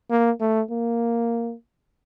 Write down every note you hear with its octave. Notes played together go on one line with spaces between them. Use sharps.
A#3
A3
A#3